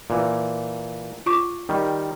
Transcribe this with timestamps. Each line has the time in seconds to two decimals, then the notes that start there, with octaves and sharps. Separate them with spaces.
0.10 A#2 E3
1.26 F4 C#6 D6
1.69 D#3 G3